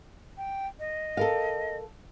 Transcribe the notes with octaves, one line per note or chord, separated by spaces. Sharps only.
G5
D#5
A4 A#4 F5